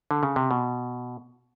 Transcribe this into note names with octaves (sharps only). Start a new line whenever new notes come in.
D3
C#3
C3
B2